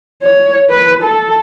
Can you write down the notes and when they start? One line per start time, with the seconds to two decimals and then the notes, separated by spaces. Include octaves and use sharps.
0.23 C#5
0.70 B4
1.03 A4